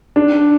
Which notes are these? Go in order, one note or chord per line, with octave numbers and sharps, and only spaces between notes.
D4